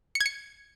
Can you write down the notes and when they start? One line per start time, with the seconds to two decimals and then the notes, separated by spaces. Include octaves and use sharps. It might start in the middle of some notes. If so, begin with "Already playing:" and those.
0.15 C#7
0.20 G#6
0.26 C#7